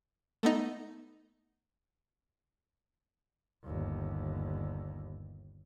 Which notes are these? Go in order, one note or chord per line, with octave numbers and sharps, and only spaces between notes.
A3 B3 D#4
G1 D#2